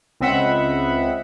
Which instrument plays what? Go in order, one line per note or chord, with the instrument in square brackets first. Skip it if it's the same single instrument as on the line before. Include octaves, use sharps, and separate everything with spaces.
[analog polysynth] C#2 C4 D#5 E5 F#5 B5